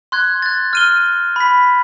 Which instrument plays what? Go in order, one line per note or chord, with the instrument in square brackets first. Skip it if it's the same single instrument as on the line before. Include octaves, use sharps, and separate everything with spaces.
[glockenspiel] C6 F#6 G#6
F#6 A6
F6 D#7 G7
B5 B6